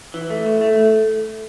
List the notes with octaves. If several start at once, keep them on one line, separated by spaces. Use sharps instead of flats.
E3
A3
A2
A3